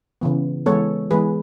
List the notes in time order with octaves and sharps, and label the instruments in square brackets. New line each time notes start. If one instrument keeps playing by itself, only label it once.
[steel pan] C#3 E3 B3
E3 G#3 B3 A4 C#5
E3 G#3 B3 G#4 B4